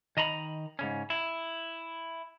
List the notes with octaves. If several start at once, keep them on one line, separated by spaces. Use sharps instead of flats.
D#3 D#5 A#5 B5
G#2 C#3 C#4
E4